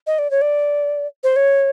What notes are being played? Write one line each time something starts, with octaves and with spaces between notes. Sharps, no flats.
D#5
D5
C#5
D5
C5
C#5